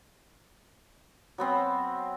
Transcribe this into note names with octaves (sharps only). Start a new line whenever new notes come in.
F#3 B3 C4